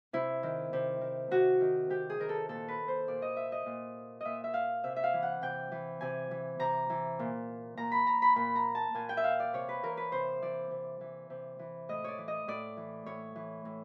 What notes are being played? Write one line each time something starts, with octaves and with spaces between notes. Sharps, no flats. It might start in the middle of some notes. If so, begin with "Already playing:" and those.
C3 E4
D#3
C3
D#3
C3 F#4
D#3
C3 G4
G#4
D#3 A#4
A4
A#2 A4
B4
C5
A#2 D5
D#5
E5
D#5
A#2
A#2 D#5 E5
E5
F5
C3 E5
E5
F5
E3
F#5
C3 G5
E3
C3 G#5
E3
C3 A#5
E3
A#2
A#2 A#5
B5
A#5
B5
A#2 B5
A#5
A5
A#2 G#5
G5
E5
F5
D5
C3 C#5
B4
E3 A#4
B4
C3 C5
E3 D5
C3
E3
C3
E3
A2 D#5
C#5 D5
E3
D#5
A2 D5
E3
A2 C#5
E3
A2